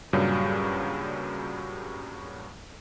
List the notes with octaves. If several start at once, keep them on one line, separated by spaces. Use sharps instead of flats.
G2 A#2 C#3 F#3 G3